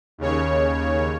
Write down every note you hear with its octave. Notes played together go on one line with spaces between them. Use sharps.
D#2 C#3 C#5